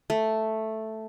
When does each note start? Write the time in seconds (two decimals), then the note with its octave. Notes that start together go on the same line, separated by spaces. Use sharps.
0.10 A3